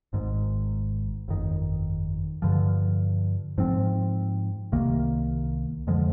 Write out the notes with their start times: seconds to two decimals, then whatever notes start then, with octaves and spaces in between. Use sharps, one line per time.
0.13 G#1 G#2 D#3
1.28 G1 F2 D#3
2.42 G2 D3 F3
3.58 G#2 F3 C4
4.72 C2 C3 D#3 A#3
5.87 F2 D3 F3 G#3